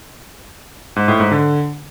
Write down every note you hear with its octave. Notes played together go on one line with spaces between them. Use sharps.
G#2
A2
G#2
D3